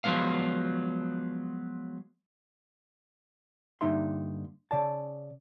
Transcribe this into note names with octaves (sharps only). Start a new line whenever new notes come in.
F3 F#3 G#3 B3 F5
G2 D3 A#3 D#4 E5 C6
C#3 D5 A5